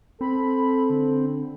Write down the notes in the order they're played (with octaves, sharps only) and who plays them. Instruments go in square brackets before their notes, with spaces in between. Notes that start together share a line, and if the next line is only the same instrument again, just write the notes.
[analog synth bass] C4 [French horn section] A4 [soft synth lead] B5
[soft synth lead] D3